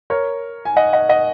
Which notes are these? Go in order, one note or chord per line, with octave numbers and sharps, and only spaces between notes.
A#4 C#5
G#5
D#5 F#5
D#5 F#5
D#5 F#5